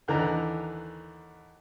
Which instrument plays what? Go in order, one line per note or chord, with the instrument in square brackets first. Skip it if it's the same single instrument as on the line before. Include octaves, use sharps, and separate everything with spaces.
[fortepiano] D#2 D3 E3 A#5